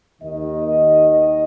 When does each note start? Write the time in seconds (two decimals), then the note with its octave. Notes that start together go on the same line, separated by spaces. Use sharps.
0.22 D#2 D#3 D#5
0.66 D#5
1.11 D#5